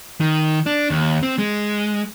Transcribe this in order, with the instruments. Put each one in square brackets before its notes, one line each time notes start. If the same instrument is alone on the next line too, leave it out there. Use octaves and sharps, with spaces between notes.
[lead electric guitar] D#3
D4
D#2
C4
G#3